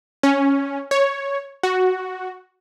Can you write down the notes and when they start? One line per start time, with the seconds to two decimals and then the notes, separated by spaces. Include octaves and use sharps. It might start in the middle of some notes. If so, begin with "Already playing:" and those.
0.23 C#4
0.91 C#5
1.63 F#4